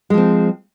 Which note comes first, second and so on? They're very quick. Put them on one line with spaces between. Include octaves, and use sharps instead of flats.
G#3 F3 C4